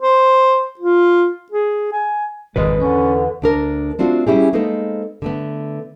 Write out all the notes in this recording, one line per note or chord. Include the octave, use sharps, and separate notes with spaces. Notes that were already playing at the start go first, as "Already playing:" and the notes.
C5
F4
G#4
G#5
G#1 F2 B2 G#3 A4 B4
E2 D3 C#4
D2 D4 A#4
A3 C4 D4 F4 F#4
G3 C#4 E4 G4 G#4
G#3 A#3 B3 D#4 A4 C5
D3 A3 B3